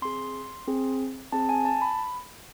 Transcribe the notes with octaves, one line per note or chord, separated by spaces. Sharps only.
C4 G#4 C6
C4 G#4
C4 G#4 A5
G#5
A5
B5